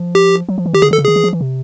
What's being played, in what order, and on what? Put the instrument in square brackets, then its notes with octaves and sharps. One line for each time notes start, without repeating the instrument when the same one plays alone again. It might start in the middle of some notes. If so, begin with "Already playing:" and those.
Already playing: [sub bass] F3
[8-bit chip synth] G4
[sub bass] F#3
F3
E3
[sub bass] D#3 [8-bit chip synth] G4
[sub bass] D3 [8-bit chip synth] G#4
[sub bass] D#3 [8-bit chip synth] A4
[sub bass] C#3
[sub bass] D#3 [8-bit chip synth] G#4
[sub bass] E3
F3
E3
C3